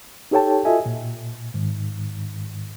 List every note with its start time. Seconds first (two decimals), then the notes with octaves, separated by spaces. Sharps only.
0.31 D#4 G4 A4 C#5 G5 A5
0.65 F4 F#4 A4 D#5 E5 G#5
0.86 A#2
1.54 G#2 D#3